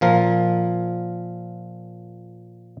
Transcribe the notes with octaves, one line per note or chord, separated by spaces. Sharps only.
A#2 F3 A#4